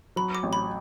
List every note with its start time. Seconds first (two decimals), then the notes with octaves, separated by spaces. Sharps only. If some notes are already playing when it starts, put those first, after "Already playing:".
0.16 F#3 B5
0.35 D6
0.43 A1
0.53 B5